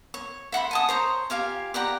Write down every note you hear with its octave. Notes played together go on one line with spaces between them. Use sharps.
C#5
E5 F#5 B5 C6
G#5 A5 D#6
C5 C#5 A#5
F4 G4 F5 G#5
G4 D5 F#5 A#5